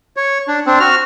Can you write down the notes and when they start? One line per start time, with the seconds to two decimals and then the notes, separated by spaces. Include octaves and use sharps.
0.17 C#5
0.48 D4
0.67 C4 D4
0.80 F#4 F6